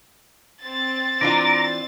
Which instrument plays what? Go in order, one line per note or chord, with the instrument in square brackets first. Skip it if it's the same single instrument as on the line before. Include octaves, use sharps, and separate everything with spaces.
[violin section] C4 A6
[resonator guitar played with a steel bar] E3 D4 F4 [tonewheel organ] A#5 D6